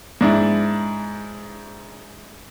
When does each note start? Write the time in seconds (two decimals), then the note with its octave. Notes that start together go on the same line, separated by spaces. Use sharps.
0.21 G#2 D4 E4